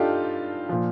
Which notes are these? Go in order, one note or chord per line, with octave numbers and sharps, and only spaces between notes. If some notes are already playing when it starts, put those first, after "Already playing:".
Already playing: G2 D4 D#4 F4 G4 A4
A#2 F3